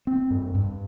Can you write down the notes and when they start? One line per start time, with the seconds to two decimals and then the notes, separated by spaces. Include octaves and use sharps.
0.07 C4
0.31 G2
0.55 G2